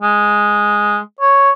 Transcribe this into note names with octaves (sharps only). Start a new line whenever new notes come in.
G#3
C#5